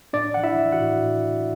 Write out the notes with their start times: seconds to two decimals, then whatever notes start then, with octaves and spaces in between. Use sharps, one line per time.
0.13 A2 D4 D5
0.34 E3 F#5
0.43 E4 E5
0.58 E3
0.72 F#4 F#5
0.81 A2
1.02 A2
1.25 A2